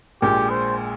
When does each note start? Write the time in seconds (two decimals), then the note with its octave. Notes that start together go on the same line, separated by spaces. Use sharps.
0.22 A#1 A#2 G#3 G4
0.50 C5